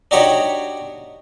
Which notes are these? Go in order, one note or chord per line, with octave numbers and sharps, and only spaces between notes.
D4 D#4 F#4 G4 C#5